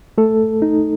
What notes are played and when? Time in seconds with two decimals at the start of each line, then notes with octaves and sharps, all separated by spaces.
0.18 A3 A4
0.62 D#4